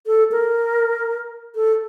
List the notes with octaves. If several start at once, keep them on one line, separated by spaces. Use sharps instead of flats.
A4
A#4
A4